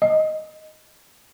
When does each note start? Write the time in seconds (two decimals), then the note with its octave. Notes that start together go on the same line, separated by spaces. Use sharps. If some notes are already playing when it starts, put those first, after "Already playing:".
0.02 D#5